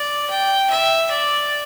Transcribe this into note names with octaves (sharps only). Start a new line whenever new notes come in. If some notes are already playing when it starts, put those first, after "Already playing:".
Already playing: D5
G5
E5
D5